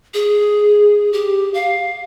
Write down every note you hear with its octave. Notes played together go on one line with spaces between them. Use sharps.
G#4
G4
F5